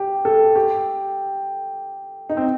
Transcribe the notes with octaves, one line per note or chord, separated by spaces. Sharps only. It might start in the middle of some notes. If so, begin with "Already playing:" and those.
Already playing: G4
A4
G4
D#4
C4